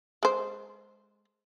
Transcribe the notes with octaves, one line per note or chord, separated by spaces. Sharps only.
G#3 C5